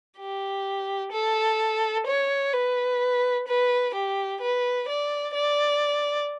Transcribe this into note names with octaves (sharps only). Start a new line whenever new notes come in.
G4
A4
C#5
B4
B4
G4
B4
D5
D5